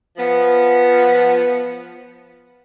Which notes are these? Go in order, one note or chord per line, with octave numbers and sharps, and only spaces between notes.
F3 B3